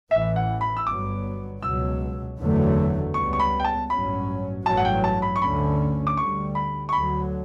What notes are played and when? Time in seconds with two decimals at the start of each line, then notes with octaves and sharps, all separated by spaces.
0.11 A1 A2 E3 E5
0.36 F#5
0.61 B5
0.77 E6
0.87 G1 G2 F#3 B3 D6
1.63 C#2 B2 F#3 E6
2.38 F#1 E2 D3 F#3 A3
3.14 C#2 C#3 G3 B3 C#6
3.33 C#6
3.40 B5
3.60 G5
3.64 A5
3.90 A1 G2 F#3 C#4 B5
4.66 A1 G2 F#3 A5
4.77 F#5
4.85 G5
5.04 A5
5.22 B5
5.36 C#6
5.42 D2 D3 A3 C#4 B5
6.07 D6
6.17 D2 D3 G3 C#6
6.55 B5
6.89 C#6
6.93 D2 D3 F#3 B5